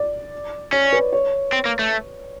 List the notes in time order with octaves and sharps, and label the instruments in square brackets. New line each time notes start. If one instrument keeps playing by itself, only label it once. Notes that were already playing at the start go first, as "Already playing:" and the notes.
Already playing: [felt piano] D5
[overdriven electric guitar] C#4 [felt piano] C#5
[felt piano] B4
C#5
[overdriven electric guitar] C4
A#3
A3